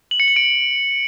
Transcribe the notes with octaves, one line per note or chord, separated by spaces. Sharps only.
F#7
C#7
F#7
D7